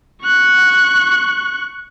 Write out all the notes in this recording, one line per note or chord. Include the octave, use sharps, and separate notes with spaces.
C#6 F#6